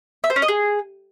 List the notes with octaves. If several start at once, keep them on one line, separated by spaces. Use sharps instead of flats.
E5
C5
C#4
D#5
G#4